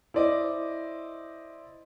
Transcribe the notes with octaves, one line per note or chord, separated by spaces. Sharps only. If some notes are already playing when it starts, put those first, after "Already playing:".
E4 C5 D5 D#5